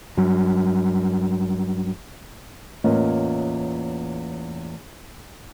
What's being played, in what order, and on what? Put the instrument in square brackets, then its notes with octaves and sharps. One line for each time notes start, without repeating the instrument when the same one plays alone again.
[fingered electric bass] G2 F#3
[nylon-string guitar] E2 A2 A#3 C#4 F4 D#5